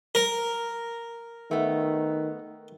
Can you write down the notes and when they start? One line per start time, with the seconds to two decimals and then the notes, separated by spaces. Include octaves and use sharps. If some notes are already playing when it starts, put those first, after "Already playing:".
0.15 A#4
1.51 D#3 A3 B3